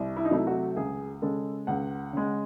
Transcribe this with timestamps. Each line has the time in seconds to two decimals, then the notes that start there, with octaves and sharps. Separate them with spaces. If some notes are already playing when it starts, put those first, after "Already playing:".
Already playing: C2
0.17 E4
0.25 D#4
0.31 C3 F#3 A3 E4
0.47 F#4
0.77 C#2 G#4
1.22 C#3 G#3 A4
1.67 C#2 F#5
2.13 C#3 G#3